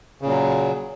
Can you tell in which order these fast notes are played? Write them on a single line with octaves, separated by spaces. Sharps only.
C#3 A#2 F#3